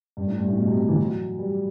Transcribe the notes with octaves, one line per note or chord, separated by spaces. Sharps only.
G2
A2
G2
A2
B2
C3
C3
E3
F#3
G3